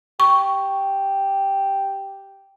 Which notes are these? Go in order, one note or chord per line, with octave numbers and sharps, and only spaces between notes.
G4 C#6